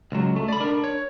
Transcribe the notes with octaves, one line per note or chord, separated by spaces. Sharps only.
C#2 F#3
A3
D5 B5
D4 A#4
C#5